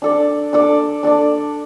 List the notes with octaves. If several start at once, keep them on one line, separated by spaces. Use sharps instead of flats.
D4 A4 D5
D4 A4 D5
D4 A4 D5